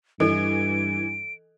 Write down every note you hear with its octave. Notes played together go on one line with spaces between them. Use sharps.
G2 E3 A4 D#5 D7